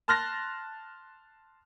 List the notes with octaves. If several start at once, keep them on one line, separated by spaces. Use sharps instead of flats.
A5 C6 F6 F#6 A6 A#6